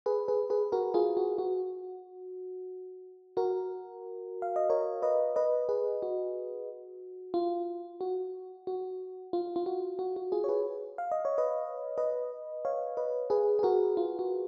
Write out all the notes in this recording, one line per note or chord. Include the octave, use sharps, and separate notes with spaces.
G#4 B4
G#4 B4
G#4 B4
F#4 A#4
F4 G#4
F#4
F#4
F#4 A#4
F5
D#5
A#4 C#5
B4 D#5
B4 D#5
G#4 B4
F#4
F4
F#4
F#4
F4
F4
F#4
F#4
F#4
F4 G#4
C#5
G#4 B4
F5
D#5
C#5
B4 D#5
B4 D#5
C#5 F5
B4 D#5
G#4 B4
G#4
F#4 A#4
F4
F#4